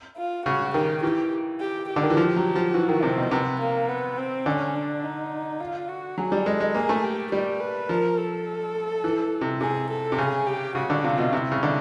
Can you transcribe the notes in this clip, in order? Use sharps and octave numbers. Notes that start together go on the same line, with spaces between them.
F4
C#3 F#4
D#3 G4
E3 G4
G4
G4
D3
D#3
E3
F3
F#3
F3
E3 F#4
D#3
C3 C4
B2
C3 B3
A#3
B3
C4
D3 C#4
D4
D#4
F4
F#4
F#3 G#4
G3
G#3 A4
G#3
A#3 G#4
A3
G4
G3 G4
B4
F3 A#4
A4
E3
C3
C3 G#4
A4
C3
C#3 G#4
G4
C#3 F#4
D3
C3 F4
B2
C3 E4
C#3
D3